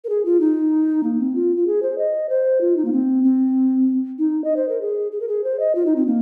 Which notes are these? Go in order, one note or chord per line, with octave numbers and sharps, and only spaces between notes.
A#4
G#4
F4
D#4
A#3
C4
F4
F4
G#4
C5
D#5
C5
F4
D#4
A#3
C4
C4
D#4
D#5
C5
A#4
G#4
G#4
A#4
G#4
C5
D#5
F4
D#4
C4
A#3